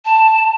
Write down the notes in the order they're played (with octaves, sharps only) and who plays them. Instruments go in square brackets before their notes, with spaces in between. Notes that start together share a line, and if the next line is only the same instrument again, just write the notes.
[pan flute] A5